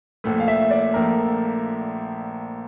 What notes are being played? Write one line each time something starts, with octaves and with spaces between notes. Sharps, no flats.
A#1 A#2 A3
F5
E5
D5
A#1 A#2 A3 A#4